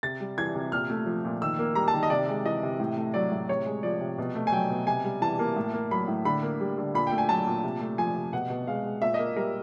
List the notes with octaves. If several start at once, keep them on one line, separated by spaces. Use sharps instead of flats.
C3 A6
G3
E3 G#6
C3
A#2 F6
A3
F3
A#2
D#3 E6
A#3
G3 A#5
A5
D#3
D#5
C3 D5
G#3
E3 D#5
C3
A2
A3
F#3 D5
A2
C3 C#5
G#3
F3 D5
C3
B2
A3
G#5
F#3 G5
B2
C3 G#5
G3
E3 A5
A#3
A2
A#3
F#3 B5
A2
D3 B5
A#3
G3
D3
A#2 B5
G5
A3
G#5
F#3 A5
A#2
C3
A3
F3 G#5
C3
B2 F#5
B2
G#3 F5
G#3
A#2 E5
A#3 D#5
G3 A#4